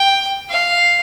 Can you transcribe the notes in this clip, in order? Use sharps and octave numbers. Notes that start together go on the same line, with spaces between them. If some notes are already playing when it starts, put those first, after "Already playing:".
Already playing: G5
F5